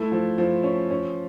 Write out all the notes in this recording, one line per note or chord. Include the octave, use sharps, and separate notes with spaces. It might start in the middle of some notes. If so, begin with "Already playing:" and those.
Already playing: A3 E4
F3
F3
C#4
C#4